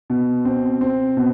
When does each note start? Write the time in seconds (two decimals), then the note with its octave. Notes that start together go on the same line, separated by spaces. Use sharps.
0.10 B2
0.45 C4
0.81 C4
1.17 B2